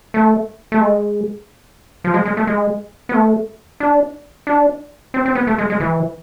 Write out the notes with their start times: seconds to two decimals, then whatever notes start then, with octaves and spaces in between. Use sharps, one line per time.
0.14 A3
0.72 A3
0.81 G#3
2.04 F3
2.14 G#3
2.25 G#3
2.37 A3
2.47 G#3
3.09 B3
3.14 A3
3.80 D4
4.47 D4
5.14 C4
5.25 C4
5.35 B3
5.47 A3
5.58 G#3
5.70 G#3
5.80 E3